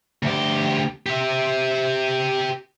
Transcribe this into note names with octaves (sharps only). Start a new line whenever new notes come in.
D2 G4
G4 E5